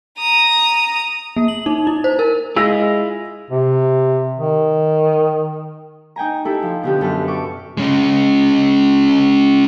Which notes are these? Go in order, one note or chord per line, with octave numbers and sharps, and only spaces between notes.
A#5 D#6
A#3
F#7
D#4
E4
C5
A#4
G#3 E4 F4 G#4 E6 A#6
C3
D#3
D#4 G5 G#5 A#5
D#4 E4 G4 A4
F3
B2 D3 G4
F#2 A4 B4 F6 G6
A4 C#6 D6
G#3 C#4